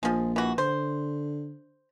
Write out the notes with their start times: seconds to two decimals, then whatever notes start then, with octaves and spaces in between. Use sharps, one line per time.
0.03 A#1 F3 G#3
0.36 E3 F#4
0.58 D3 C5